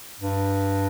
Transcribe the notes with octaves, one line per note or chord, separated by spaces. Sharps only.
G2